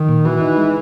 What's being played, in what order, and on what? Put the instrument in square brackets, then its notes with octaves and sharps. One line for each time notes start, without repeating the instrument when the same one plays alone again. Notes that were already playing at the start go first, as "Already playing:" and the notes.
Already playing: [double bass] D#3
[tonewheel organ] A#2
[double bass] E3 [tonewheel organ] F#4
[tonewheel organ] D#4
G#3